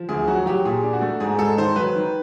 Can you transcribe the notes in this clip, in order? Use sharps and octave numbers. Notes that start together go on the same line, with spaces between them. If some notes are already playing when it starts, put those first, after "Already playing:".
Already playing: F3
D2 G#4
F#3 F#4
F#3 G4
A#2 G#4
D4
F#4
A3
G#2 G#4
G#3 A4
D#3 C5
F#3 B4
D#3